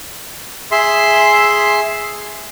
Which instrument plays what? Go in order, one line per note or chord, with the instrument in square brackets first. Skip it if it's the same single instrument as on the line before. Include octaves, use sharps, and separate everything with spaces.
[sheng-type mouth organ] G#4 E5 C6